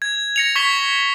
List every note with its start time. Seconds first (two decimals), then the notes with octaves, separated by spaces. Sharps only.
0.02 G#6
0.36 A#6 C#7 F7
0.56 C#6 G#6 B6 G7